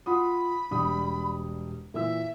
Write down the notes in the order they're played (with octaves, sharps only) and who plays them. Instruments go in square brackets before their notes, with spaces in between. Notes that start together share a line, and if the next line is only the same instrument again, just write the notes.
[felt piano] F4 F#5 D#6 [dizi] B5
[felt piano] E1 G3 D#6
[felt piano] A#2 E3 E6 [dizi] E5